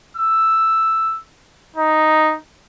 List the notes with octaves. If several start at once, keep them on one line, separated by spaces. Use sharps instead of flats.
E6
D#4